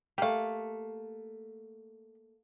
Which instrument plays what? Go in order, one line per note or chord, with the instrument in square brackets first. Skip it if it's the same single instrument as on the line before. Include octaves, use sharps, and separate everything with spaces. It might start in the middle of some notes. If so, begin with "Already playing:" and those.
[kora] A3 A#3 [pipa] G4 F5